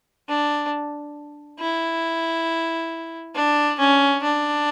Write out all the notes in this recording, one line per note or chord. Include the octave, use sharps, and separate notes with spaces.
D4
E4
D4
C#4
D4